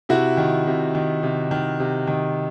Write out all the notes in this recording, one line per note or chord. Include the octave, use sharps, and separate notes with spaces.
C3 E4 F#4
D#3
C3
D#3
C3
D#3
C3
D#3